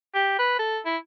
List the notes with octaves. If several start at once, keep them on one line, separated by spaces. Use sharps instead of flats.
G4
B4
A4
E4